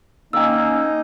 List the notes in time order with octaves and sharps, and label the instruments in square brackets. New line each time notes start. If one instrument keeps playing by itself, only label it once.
[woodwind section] A#3 C#4 [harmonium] D#4 [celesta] G5 E6